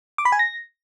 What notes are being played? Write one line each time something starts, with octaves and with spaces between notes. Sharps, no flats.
D6
B5
G#5
A#6